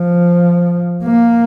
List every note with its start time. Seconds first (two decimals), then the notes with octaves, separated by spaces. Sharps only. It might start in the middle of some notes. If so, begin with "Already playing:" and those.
Already playing: F3
1.04 A#3